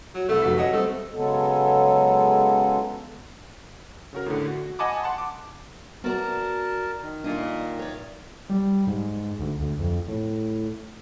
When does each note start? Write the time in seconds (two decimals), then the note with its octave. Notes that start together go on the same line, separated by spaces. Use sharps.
0.14 F#3
0.29 C2 A3 B4
0.42 F1 F#4 B6
0.58 F#3 D#5 F#5
0.73 G3 A3 C4
1.15 C#3 F#3 G#3 B3 A4
4.13 C#3 F#4 A#4
4.26 A2 D3
4.48 F#4
4.79 D#5 F#5 G#5 A5 B5 D6
5.03 F#5 A5 C6
5.18 D6
6.04 B3 F#4 A#4 D5 A5 A#5
7.02 D#3
7.24 A#2 D4 D#5
7.79 C#5 D5
8.49 G3
8.87 G#2
9.39 D2
9.60 D2
9.79 F2
10.08 A2